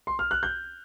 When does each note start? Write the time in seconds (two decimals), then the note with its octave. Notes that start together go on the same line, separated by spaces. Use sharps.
0.07 C6
0.19 F6
0.31 F#6
0.43 G6